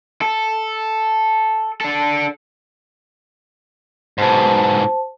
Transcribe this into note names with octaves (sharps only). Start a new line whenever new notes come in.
A4
D4 A4
G#2 B2 C5 A5